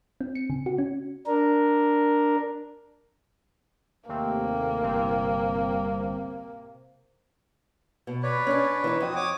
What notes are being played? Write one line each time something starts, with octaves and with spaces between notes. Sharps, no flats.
C4
C#7
C#3
F#4
C#4
D4 A#4
D#2 C3 A3 A#3 C4
G1 C2 C4
B2
B4 C#5 D5
C#4 D4
E3 D#4
F2 C4 F#4 D#6
C#5 D6 D#6